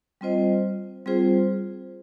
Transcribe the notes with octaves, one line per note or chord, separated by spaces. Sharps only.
G3 C4 F4 C5 D#5
G3 C4 F4 G#4 C5